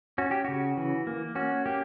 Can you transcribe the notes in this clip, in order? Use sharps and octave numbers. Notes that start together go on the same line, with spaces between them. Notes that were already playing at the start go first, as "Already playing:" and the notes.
C#4 F#4
G4
C#3 F#4
E3
A#3
C#4 F#4
A#3 G4